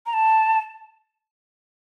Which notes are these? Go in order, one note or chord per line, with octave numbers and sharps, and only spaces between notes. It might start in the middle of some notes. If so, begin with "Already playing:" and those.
A#5
A5